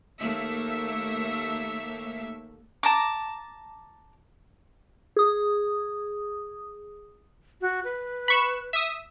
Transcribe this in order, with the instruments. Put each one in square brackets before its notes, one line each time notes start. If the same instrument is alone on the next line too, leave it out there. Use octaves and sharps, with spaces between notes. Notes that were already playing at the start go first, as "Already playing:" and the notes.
[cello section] D#2 A3 A#3 E5
[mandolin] A5 A#5 D6
[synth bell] G#4 D#6
[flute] F#4
B4
[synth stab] B5 C#6 E7
E5 D#6